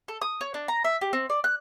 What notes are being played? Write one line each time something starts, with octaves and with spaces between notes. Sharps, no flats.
A4
D#6
C#5
D4
A#5
E5
G4
C4
D5
F#6